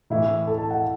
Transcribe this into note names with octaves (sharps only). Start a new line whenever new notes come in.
A2 E3 E4
A4
A5
F#5